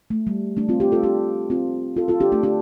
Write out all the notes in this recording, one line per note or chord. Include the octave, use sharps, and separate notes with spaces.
A3
G3
A3 D4
C4 F4
D4 G4
F4 A4
D4 G4
C4 F4
F4 A4
F4 A4
D4 G4
A3 D4
D4 G4